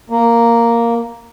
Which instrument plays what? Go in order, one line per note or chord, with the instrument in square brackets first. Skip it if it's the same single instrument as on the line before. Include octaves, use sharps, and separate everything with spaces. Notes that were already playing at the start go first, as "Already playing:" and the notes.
[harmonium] A#3